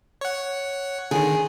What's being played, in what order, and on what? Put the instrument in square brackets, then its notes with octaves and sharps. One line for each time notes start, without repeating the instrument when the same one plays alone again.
[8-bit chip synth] C#5 F#5
[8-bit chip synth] D3 D#3 [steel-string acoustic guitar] G#4